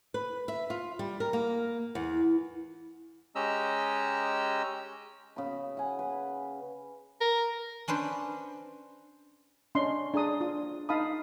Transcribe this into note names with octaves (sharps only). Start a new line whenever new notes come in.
B4
E5
F4
G3
A#4
A#3
E2
G#3 C#4 G4 D#5 A#5 E6
C#3 B5
F#5 G#5
B4
A#4
C#4 D4 B4 C5
C#4 D4 D#5 C6
D4 G#4 A#5 D#6
F4
D#4 F5 A5 B5 D#6